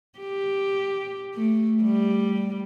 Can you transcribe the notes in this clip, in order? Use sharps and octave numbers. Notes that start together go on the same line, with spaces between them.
G4
A3
G3